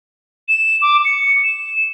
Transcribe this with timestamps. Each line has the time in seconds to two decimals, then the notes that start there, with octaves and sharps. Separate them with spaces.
0.49 E7
0.82 D6
1.05 C#7
1.44 E7